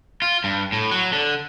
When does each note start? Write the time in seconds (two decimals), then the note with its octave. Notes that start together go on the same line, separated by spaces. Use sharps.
0.22 F4
0.44 G2
0.72 A2
0.91 F#3
1.13 D3